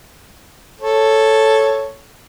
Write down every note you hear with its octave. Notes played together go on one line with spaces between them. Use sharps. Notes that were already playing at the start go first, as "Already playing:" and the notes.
A4 C#5